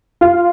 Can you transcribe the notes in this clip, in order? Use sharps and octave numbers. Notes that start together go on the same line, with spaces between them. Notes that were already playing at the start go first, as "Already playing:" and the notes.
F4